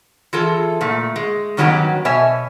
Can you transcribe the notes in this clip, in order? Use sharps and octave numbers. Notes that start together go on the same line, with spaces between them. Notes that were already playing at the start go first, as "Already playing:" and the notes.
E3 F4 G#4 A4
A#2 A3
G#3
G2 D#3 F#3 B3 C#4 G4
B2 C#5 E5 G#5